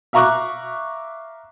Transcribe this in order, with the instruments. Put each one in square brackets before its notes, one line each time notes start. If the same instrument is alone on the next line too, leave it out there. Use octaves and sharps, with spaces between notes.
[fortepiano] E5 F5 A#5 C#6 D6 F#6